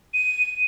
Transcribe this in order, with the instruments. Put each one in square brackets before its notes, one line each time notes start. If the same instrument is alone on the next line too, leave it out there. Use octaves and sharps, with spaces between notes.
[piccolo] D#7